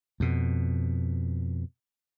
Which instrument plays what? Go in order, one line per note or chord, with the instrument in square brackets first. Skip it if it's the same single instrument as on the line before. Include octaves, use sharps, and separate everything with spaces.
[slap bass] F2 B2